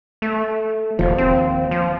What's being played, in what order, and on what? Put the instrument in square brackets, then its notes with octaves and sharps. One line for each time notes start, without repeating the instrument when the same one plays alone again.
[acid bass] A3
[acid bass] E1 [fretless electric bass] D#2 F3
[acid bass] C4
F3